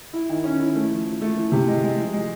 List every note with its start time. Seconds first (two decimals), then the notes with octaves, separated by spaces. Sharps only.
0.13 E4
0.29 D#3
0.44 C#4
0.60 E4
0.75 A3
0.91 F3
1.05 F3
1.21 A3
1.37 E3
1.52 C3
1.68 G#3
1.83 G#3
1.98 F3
2.13 G#3